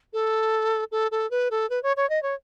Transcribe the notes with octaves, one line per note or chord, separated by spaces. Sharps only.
A4
A4
A4
B4
A4
B4
C#5
C#5
D#5
C#5